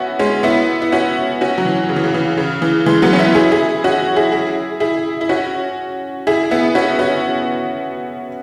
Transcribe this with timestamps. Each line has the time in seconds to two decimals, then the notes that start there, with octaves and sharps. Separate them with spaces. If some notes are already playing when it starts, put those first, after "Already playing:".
Already playing: B3 C#4 E4 F#4
0.19 G#3 C#4
0.43 B3 E4
0.82 E4
0.92 C#4 F#4
1.41 C#4 F#4
1.58 F#3
1.65 E3
1.89 C#3
1.96 E3
2.04 C#3
2.14 E3
2.37 C#3
2.62 E3
2.86 E3 G#3
3.02 F#3 B3
3.13 C#4
3.19 B3 E4
3.35 E4 G#4
3.52 E4 G#4
3.84 C#4 F#4
4.16 E4 G#4
4.32 E4 G#4
4.80 E4 G#4
5.21 E4
5.29 C#4 F#4
6.27 E4 G#4
6.51 B3 E4
6.75 C#4 F#4
6.99 C#4 F#4